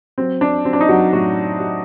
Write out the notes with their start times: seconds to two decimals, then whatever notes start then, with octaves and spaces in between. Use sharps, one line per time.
0.18 F#3 C4
0.41 D4
0.65 F#3 C4
0.73 D4
0.81 D#4
0.89 F#3 F#4
1.13 A2 F#3 F#4
1.60 F#3